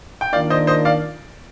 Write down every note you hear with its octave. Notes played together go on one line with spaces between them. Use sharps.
G5
D#3 A#3 D4 F4 D5 F5
C5 D#5
C5 D#5
D5 F5